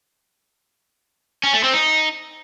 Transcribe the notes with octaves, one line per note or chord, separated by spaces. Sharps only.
C#4
A3
C4
D#4